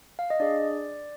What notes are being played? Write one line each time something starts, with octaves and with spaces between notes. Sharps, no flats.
F5
D#5
D4 G#4 D5